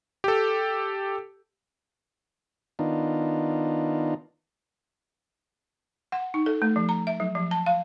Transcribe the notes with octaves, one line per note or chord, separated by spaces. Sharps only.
G4 A4
D#3 B3 D4 D#4 F4
F#5
D#4
A4
A3
F3
A#5
E5
F#3
F3
A5
F5